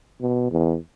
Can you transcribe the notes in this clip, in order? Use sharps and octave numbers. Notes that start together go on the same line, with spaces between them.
B2
E2